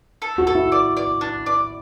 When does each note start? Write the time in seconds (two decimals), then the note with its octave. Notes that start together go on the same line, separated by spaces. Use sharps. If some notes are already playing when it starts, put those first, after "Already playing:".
0.22 A4
0.38 F#4
0.47 A4
0.55 E4
0.72 D5
0.97 D5
1.21 D4
1.46 D5